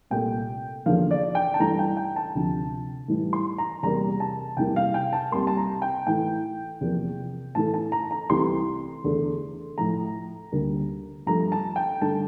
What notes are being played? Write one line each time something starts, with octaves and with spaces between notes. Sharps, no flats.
C2 A#2 A3 G5
E2 D3 F3 A#3 F5
D5
G5
A5
G2 E3 A3 A#5
G5
G5
A5
D2 C3 F3
A2 E3 G3
C6
A#5
E2 C3 G3 A#3 A#5
A5
E2 C3 E3 G3 A#3 G5
F5
G5
A5
C2 C3 G3 A#3 C6
A5
A#5
G5
A2 E3 A3 G5
E2 C3 F3 A#3
A2 E3 A3 A5
A5
A#5
A#5
C2 C3 E3 A3 C6
E2 D3 A3
A2 F3 A3 A#5
D2 D3 G3 A#3
G2 F3 A3 A#5
A5
G5
G2 D3 A3 A5